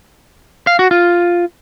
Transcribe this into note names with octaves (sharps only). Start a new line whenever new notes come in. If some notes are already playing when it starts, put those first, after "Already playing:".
F5
F#4
F4